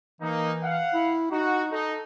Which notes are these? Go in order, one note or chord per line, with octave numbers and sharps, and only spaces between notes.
E3 A#3 D#4
F5 F#5
E4
D#4 F#4
D#4 A4